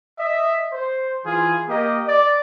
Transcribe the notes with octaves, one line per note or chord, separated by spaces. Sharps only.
D#5 E5
C5
E3 F4 G#4
A#3 G4 D#5
D5